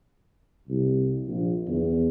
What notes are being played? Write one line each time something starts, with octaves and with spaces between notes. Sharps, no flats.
C2
A#1
E2